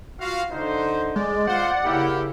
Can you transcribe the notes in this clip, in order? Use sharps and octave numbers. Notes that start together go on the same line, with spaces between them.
F4 F#4 F5
D3 D#4 C5
G#3 D5
F4 C5 F#5
C#3 A#3 E4 G4